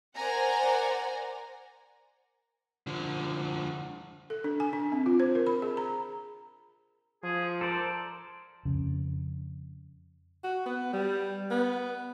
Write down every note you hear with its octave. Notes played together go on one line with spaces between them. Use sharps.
A#4 C5 D5 F#5 G#5 A#5
D3 F3
A4
D4
G#5
D4
C4
F4
C5
A#4
B5
G#4
A#5
F3 G#4
A4 A#4 C5 D5
F2 C#3
F#4
B3
G3
B3